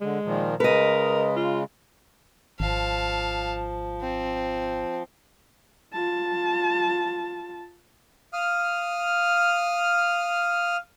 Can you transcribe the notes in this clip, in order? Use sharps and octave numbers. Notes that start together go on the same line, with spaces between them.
D3 G#3
A#2 D#3 F3
C#3 G#3 A#4 B4 D#5
F4
G#1 F3 F5 A5
C4
F4 A5
F5 D#6 F6